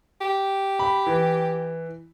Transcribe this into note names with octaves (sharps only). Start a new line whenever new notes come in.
G4
B5
E3